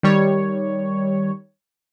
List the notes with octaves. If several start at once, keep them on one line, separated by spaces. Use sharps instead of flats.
D#3 G3 C#5